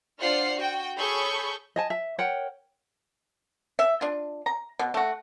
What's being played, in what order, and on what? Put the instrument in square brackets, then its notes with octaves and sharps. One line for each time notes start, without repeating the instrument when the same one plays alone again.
[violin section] D4 F4 C5 F#5 F6 C7
F#4 G5
G#4 A4 C#5 B5 C#6 G6
[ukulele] D#5 G#5 A5
E5
A#4 C#5 F#5 G5
[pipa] E5
D4 F4
A#5
B2
A3 F#4